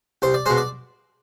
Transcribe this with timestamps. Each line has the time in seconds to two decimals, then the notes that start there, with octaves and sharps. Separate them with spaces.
0.22 C2 C5
0.34 D5
0.46 B2 G#3 C5
0.57 D5